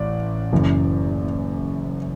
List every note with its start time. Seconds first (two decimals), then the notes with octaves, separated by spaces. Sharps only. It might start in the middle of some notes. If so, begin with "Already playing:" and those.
Already playing: A1 D5
0.52 F#1 F#2 E3